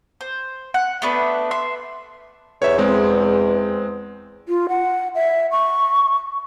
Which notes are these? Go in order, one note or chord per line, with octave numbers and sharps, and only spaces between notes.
C5
F#5
A3 B3 D4 B4
E5 C6
E2 C#5 E5
G#3 C4
F4
F#5
E5
C#6